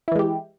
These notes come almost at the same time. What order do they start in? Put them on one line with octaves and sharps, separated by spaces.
E4 E3 G#3 G4